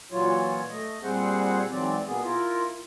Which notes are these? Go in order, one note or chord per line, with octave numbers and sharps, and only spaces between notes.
A#2 E3 F#3 F4 C#5
A3 D#5
A#2 G3 C4 G#4 C5 F#5
G#2 E3 F#3 C4 D5
B2 A#3 B3 G#4
E4 F4 A#4